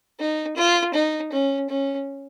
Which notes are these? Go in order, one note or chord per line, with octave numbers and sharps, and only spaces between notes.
D#4
F4
D#4
C#4
C#4